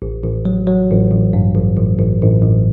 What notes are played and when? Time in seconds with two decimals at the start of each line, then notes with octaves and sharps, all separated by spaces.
0.02 A1
0.23 A1
0.45 F#3
0.67 F#3
0.90 A1
1.11 A1
1.33 G2
1.55 A1
1.78 A1
1.99 A1
2.22 A1
2.43 A1